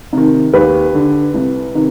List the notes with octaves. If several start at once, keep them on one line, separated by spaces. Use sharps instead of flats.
C3 D#3
D#2 G4 B4
D3
C2
C3 D#3